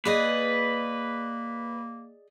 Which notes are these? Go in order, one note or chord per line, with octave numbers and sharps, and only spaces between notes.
A#3 G#4 B4 D5 D#5